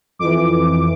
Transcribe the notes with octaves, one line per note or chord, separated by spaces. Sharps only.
F2 E3 D6